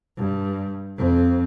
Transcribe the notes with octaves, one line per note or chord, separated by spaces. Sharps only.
G2
F2 C4